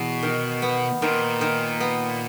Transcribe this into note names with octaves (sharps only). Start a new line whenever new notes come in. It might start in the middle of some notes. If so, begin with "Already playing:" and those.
Already playing: E2 B2
D#3
B3
A#2 D#3
D#3
B3